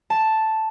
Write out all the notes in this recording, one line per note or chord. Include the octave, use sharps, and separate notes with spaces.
A5